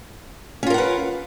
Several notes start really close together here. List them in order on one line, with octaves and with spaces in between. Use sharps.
C#4 F4 A#4 F#5 B4